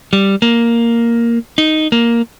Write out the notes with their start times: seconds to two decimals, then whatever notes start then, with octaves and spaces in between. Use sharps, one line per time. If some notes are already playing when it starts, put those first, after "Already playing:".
0.13 G3
0.42 A#3
1.58 D#4
1.92 A#3